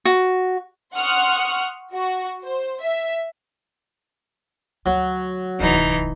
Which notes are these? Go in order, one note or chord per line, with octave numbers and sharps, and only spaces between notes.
F#4
F#5 C6 C#6 D#6 F6 F#6
F#4
C5
E5
D2 F#3
D1 C2 E3 D#4